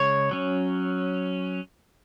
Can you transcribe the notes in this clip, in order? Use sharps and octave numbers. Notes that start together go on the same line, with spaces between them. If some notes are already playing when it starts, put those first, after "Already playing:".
Already playing: C#3 G#3 C#5
F#3 C#4